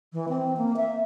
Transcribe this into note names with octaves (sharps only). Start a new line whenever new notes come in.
E3
C4
A#3
E5